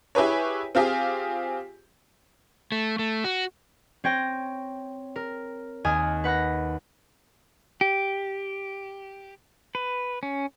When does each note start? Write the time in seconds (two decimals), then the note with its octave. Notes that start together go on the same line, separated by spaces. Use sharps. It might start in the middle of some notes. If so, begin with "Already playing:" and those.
0.15 E4 G4 G#4 B4 C#5
0.75 C4 F4 G4 G#4
2.72 A3
2.99 A3
3.24 F#4
4.04 C4 C#5 G5 A#6
5.16 A#4
5.84 D#2 G#5 D#6 F6
6.24 B4 F#5 B5 A#6
7.81 G4
9.75 B4
10.23 C#4